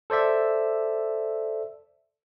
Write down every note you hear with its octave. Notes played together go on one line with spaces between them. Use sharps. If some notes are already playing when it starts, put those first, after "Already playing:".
A4 C5 D5 E5